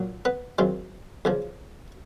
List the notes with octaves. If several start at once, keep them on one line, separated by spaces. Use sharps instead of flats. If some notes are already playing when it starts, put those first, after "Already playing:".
Already playing: A#2 F#3
B3 B4
F#2 D#3 G#3 C4 F4
E2 C#3 F3